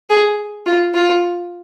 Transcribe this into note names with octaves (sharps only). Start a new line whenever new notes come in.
G#4
F4
F4